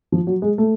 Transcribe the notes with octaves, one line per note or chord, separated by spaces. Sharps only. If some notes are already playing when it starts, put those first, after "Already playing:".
F3
F#3
G#3
A3